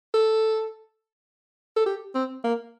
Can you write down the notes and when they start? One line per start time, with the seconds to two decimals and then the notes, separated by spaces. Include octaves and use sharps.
0.14 A4
1.77 A4
1.86 G4
2.15 C4
2.44 A#3